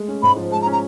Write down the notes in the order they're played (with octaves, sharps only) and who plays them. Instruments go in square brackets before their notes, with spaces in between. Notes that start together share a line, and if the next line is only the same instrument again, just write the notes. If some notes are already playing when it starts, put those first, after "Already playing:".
Already playing: [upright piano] G#3 A3
C#4
[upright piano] G#2 [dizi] B5
[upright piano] F3
[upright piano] G#3 [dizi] A5
[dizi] A#5
[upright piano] C#4
[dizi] A#5